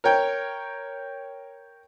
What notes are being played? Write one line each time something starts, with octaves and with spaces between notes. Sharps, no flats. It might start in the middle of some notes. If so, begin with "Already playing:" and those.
A#4 C#5 G5